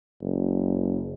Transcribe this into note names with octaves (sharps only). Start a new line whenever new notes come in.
F#1